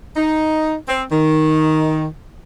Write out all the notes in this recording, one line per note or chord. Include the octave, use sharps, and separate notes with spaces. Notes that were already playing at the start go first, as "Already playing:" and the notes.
D#4
C4
D#3